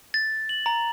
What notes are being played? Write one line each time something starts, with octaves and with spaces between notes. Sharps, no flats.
A6
F#7
A#5